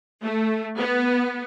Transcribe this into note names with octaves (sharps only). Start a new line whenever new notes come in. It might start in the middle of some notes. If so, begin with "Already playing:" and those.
A3
B3